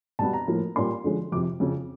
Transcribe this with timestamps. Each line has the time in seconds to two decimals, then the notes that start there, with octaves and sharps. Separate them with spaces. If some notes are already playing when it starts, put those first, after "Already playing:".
0.19 B2 G3 B3 A5
0.33 A#5
0.48 A2 F3 A#3
0.76 A#2 G3 A#3 C#4 C6
1.04 D3 F3 G#3 C#4
1.32 F2 C3 F3 D6
1.60 F2 C#3 F3